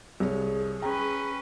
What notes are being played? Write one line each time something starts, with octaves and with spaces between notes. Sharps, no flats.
C2 G#4 C#5
C#4 B4 G5 A#5